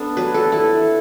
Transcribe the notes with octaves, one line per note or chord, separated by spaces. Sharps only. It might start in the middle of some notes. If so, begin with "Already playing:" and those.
Already playing: B3 D4 A4
F#3 B4
A4
E4 A4